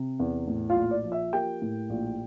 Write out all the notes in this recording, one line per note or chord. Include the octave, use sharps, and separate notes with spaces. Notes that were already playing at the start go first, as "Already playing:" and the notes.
Already playing: C3
E2
A2
F4 F5
A#1
D5
F3
E5
A#3 G4 G5
A2
A#1